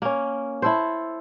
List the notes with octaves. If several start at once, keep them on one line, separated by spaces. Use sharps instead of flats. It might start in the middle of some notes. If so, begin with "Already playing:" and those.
A#3 C#4
E4 A4 C5